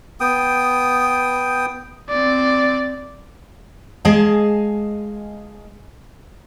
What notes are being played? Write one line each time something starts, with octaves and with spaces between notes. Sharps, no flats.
B3 G5 D#6
C4 D5
G#3 G#4 D#5 F5 A5